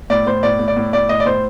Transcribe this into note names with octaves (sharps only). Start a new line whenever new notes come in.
A2 D5
A2 C5
A2 D5
A2
D5
A2
A2 D5
A2 D#5
D5
A2 C5